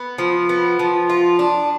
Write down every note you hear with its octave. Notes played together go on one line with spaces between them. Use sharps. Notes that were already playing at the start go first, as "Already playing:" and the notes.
Already playing: B3
F3
B3
F3
F4
D4